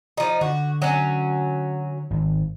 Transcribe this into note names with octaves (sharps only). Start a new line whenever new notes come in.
F3 D#4
D3 F#4
F#3 C#4
G#1